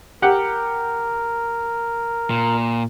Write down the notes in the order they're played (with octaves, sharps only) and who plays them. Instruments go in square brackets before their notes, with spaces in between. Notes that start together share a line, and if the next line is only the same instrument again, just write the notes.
[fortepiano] G4 F#5 [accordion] A#4
[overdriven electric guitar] A#2